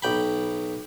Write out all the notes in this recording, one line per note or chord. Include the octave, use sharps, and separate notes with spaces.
B1 G5 B5